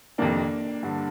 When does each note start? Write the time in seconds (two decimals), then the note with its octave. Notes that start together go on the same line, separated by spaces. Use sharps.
0.18 F2 C3 D#3 A#3 D4
0.83 G2 D3